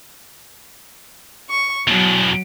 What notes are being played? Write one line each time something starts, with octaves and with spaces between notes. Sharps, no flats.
C#6
E2 B2 F#3